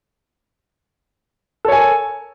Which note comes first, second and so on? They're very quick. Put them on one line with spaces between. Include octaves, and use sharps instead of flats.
A4 C#5 G#5 A#4